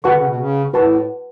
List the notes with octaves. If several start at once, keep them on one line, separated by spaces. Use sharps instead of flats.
D3 F#4 B4 F#5 A5 C#6
C#3
B2
C#3
A2 F#4 B4 F#5 A5 C#6